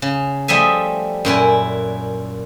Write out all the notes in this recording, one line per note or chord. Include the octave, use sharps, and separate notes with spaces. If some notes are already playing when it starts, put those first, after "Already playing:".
C#3
F3 G3 A3 D#5 E5 G#5
F#2 A#2 E4 G#5